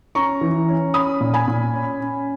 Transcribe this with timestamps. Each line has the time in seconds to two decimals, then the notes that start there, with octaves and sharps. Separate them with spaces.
0.15 C#4 A#5 C#6
0.41 E3
0.69 C#4
0.94 C#4 B5 D#6
1.20 A#2
1.34 G#5 B5
1.48 A#2
1.73 C#4
2.00 C#4